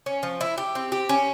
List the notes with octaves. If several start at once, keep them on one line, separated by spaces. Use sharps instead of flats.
C#4
F3
E4
G4
C4
G4
C#4